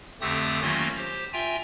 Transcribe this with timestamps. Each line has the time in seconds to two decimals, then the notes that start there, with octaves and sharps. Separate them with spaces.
0.21 F2 D3 A3 C4 G4 D#6
0.61 D#3 F#3 A3 A#3 C#4 F4
0.97 G4 C5
1.33 F4 E5 G5 G#5 A#5